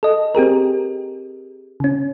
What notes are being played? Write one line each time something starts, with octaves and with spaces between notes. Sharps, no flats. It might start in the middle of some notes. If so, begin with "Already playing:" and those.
A4 D#5
C4 G4 G#4 A#4
C#3 C#4